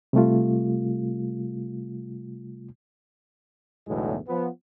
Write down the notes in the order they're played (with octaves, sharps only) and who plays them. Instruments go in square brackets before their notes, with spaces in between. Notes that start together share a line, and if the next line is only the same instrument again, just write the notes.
[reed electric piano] C3 G3 A3 F4
[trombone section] B1 E2 A2 D3 F#3 G#3
F3 B3